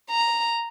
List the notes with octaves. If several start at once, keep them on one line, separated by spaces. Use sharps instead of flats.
A#5